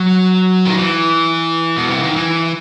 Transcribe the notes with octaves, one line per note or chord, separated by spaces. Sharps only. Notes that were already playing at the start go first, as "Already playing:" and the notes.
Already playing: F#3
D#3
E3
B2
C3
D#3
E3